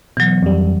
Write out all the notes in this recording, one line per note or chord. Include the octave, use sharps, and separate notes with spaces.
B2 E3 F#3
F2 G3